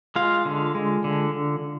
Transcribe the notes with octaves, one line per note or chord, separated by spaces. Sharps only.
G#3 F4 F5
D3
G#3
D3